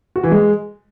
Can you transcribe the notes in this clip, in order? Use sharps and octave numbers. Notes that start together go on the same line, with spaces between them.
F#4
E3
G#3